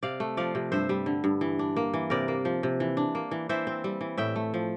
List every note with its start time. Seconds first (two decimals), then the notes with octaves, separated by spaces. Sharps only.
0.03 C3 D5 F5
0.20 A3
0.37 F3 D5 F5
0.55 C3
0.72 G2 C5 E5
0.89 G3
1.06 D3
1.24 G2
1.41 E3
1.59 D4
1.76 A#3
1.94 E3
2.10 C3 A#4 D5
2.28 A#3
2.45 F3
2.63 C3
2.80 E3
2.97 D4
3.15 A#3
3.31 E3
3.49 E3 C5 E5
3.67 C4
3.84 G3
4.01 E3
4.18 A2 E5 G5
4.36 A3
4.54 F3